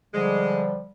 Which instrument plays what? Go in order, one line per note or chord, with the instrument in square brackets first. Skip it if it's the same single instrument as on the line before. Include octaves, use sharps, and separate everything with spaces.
[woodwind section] D3 F3 G3 [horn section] G#3